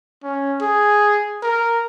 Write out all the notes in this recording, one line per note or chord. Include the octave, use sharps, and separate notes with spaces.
C#4
G#4
A#4